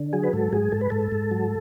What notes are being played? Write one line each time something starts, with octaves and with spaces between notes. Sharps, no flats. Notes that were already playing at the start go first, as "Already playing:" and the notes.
Already playing: D3
F#3 G#4
B4
G#2 A4
G#2 G#4
G#2 A4
B4
G#2 A4
G#2
F#3